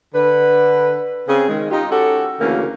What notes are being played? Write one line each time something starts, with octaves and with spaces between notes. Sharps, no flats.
D3 B4
C#3 C4 G#4
D#3 G#3
D#4 F4 G4
C#4 F#4 G4 A4
D2 C#3 E3 A#3 C#4 A#4